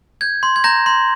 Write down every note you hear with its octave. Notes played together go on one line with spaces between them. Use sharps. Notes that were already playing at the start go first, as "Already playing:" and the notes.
G6 G#6
C6
G#6
A#5 G6 A#6
C6